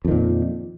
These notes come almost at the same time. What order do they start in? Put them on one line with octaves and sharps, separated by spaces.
F2 D#3 A#2